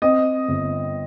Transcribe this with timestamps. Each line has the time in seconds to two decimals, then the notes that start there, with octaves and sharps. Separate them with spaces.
0.02 C4 D#5
0.48 G1